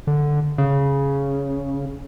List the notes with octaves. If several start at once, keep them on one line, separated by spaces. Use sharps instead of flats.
D3
C#3